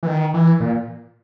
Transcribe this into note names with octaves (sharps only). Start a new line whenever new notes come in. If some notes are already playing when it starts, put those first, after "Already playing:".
E3
D#3
E3
A#2